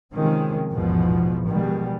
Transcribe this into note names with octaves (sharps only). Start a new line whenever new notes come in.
C3 D#3 F3 G#3 C4 C#4
A1 E2 G#2 B2 F3
B2 D#3 F3 G3 G#3